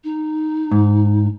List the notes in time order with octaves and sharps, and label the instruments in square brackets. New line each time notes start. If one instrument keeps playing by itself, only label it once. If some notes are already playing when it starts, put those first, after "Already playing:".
[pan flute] D#4
[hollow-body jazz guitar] G#2